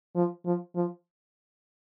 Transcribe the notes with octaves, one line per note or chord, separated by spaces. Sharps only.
F3
F3
F3